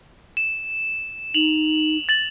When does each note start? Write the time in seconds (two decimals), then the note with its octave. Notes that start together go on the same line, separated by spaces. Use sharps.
0.37 E7
1.34 D#4 F7 F#7
2.09 A6 F#7